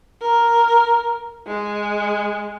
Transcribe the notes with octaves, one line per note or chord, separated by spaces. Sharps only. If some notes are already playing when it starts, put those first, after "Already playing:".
A#4
G#3